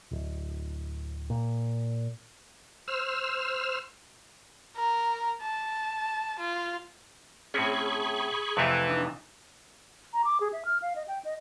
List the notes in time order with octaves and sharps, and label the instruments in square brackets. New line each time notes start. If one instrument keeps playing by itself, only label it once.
[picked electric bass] D1
A#2
[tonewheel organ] C5 E6 F6
[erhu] A#4
A5
F4
[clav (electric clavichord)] A2 C4 C#4 [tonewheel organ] G#4 B5 C#6
[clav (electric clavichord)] F2 C3 A3 [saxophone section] E3
[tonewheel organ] D4 D#4
[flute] A#5
D6
G#4
E5
F6
F5
D#5
G5
D#5